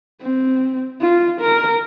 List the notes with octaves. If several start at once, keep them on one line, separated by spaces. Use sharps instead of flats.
C4
F4
A#4